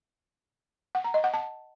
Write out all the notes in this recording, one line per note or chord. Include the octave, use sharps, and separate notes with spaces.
F#5
A#5
D#5
F#5
A5